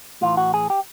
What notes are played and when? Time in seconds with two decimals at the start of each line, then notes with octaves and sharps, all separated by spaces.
0.21 A2 E3 F4
0.37 F#4
0.54 G#4
0.70 G4